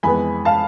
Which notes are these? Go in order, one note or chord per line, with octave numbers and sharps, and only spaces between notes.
F2 E3 G#3 B3 G#5 B5
F5 A5